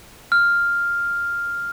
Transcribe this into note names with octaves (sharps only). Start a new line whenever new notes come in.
F6